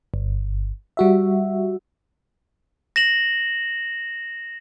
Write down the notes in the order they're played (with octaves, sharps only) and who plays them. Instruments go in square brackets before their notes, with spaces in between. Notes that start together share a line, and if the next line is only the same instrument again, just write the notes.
[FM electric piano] G1
G3 F#4 E5
[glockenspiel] A#6 E7 F#7